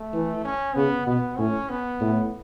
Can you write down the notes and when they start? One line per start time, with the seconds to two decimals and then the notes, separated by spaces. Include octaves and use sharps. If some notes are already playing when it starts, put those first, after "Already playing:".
Already playing: A3
0.13 E3
0.45 C#4
0.75 C#3 B3
1.06 B2 B3
1.38 A2 C#4
1.69 B3
2.01 A2